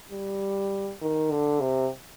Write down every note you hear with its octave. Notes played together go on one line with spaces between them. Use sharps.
G3
D#3
D3
C3